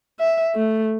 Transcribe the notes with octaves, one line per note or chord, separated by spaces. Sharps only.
E5
A3